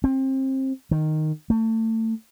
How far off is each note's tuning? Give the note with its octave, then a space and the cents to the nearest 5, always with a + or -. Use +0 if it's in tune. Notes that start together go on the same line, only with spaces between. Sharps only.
C4 +25
D#3 -5
A3 +30